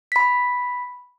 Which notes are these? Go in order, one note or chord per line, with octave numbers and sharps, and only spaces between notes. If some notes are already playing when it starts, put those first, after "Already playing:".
B5 B6